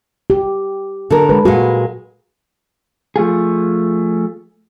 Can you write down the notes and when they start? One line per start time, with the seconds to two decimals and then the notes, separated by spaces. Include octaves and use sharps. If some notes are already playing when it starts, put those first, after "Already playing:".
0.30 G4
1.10 D3 A#4
1.29 G#3 B4
1.45 A#2 G#3 F#4
3.16 F3 A3 F4 G#4